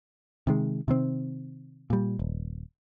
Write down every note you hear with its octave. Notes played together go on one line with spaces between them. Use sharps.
C3 D#3 G#3
C3 D#3 C4
A#2 G3
D#1